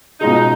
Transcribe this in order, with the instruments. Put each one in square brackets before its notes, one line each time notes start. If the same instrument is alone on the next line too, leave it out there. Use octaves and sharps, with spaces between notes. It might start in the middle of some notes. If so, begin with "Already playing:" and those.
[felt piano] B2 G#3 C#4 F4 G#4 [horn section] D#4